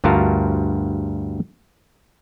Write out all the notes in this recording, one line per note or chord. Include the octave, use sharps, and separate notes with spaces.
D2 G2 F4 F#4 A#4 A5